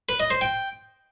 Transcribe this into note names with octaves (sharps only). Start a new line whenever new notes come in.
B4
D#5
C5
G5